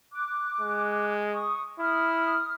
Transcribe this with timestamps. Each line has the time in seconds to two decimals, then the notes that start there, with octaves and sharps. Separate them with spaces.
0.12 D6 F#6
0.61 G#3
1.33 C#6 D#6
1.79 E4 D#6 F6